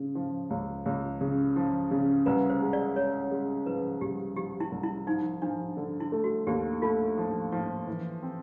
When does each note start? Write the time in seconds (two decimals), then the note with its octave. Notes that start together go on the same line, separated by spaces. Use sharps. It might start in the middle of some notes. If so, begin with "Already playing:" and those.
Already playing: C#3
0.15 F3
0.50 C#2
0.86 C#2
1.21 C#3
1.56 F3
1.91 C#3
2.26 C2 B4
2.50 C5
2.61 G#3
2.73 D5
2.96 G#3 C#5
3.31 G#3
3.66 F3 B4
4.01 C2 G4
4.36 F3 G4
4.60 E4
4.72 C2
4.83 E4
5.07 F3 D#4
5.42 F3 D4
5.77 D3
6.00 E4
6.12 A3
6.24 F#4
6.47 D#2 G4
6.82 A3 F4
7.18 F3
7.52 F3
7.87 E3
8.22 C4